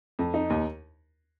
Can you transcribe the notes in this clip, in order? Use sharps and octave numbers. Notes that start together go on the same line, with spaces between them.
F2
D#4
D#2